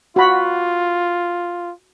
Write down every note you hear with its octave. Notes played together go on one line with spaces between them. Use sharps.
F4 F#4 B5